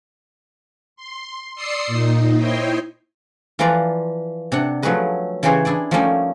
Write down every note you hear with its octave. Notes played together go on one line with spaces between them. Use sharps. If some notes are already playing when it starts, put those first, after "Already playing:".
C6
D5 C6 D#6 E6 C7 C#7
A#2 D#4
E4 C5 C#5 D#5 G5 C6
E3 F3 F4 B4 D5 A#5
C3 D4 F#5
F3 F#3 A3 G#4 B4 D#5
C#3 E3 G4 G#4 C5 C#5
D4 E4 G#4 D5
F3 G3 A3 A#3 C#4 D#4